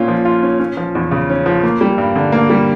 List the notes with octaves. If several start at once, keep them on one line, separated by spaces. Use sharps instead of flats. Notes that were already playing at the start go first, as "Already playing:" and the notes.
Already playing: A#2 C#4 F4
F3
F4
C#4
C#4
F3
E2
C#3
C#4
F3
A#3
G3
G2
D3
A#3
G3